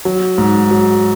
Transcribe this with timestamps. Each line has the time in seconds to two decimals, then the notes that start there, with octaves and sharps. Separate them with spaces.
0.05 F#3
0.38 G#2
0.71 F#3